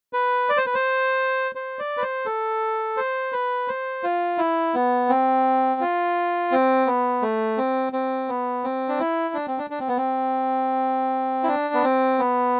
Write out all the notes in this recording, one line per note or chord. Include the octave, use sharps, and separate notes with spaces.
B4
D5
C5
B4
C5
C5
D5
B4
C5
A4
C5
B4
C5
F4
E4
B3
C4
F4
C4
B3
A3
C4
C4
B3
C4
D4
E4
D4
C4
D4
D4
C4
B3
C4
E4
D4
B3
C4
B3